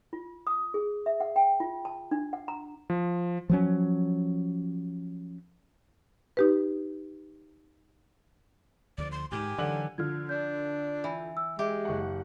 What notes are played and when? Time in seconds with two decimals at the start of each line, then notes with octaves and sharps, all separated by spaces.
0.13 F4
0.47 D#6
0.74 G#4
1.06 E5
1.20 F#5
1.36 G5
1.60 F4
1.85 A5
2.11 D4
2.33 F#5
2.48 A#5
2.90 F3
3.50 F3 F#3 C#4
6.37 D#4 G4 B4
8.98 D2 D3 F3 D5
9.12 C6
9.31 A1 G#2 D#3 G4 G#5
9.58 D3 E3 F#3 F#7
9.98 D3 F3 F6 G#6
10.29 D4 G6
11.04 E3
11.37 E6
11.59 G#3 G4 E5
11.85 F#1 E5 F#5 C#6